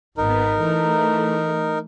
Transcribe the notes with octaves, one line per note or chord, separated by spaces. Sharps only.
G#1 B3 D#4 A#4
E3 A3